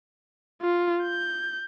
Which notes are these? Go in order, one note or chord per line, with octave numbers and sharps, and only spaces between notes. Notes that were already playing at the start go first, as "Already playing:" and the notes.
F4
G6